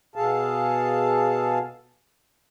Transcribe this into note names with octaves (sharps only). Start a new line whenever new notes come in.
B2 G#4 A4 F5 A5